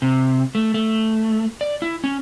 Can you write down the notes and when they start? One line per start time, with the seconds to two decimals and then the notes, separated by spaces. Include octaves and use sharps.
0.02 C3
0.55 A3
0.74 A3
1.61 D5
1.82 E4
2.04 C#4